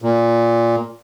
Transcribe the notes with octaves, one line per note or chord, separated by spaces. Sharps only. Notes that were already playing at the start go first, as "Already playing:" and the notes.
A#2